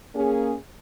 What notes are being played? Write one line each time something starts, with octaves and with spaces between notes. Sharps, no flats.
A#3 C#4 G#4